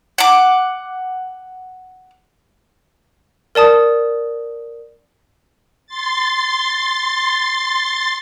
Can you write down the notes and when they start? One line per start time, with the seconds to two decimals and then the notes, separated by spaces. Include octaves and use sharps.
0.18 F#5 D6
3.55 A#4 D5 A5 D#6
5.87 C6 A6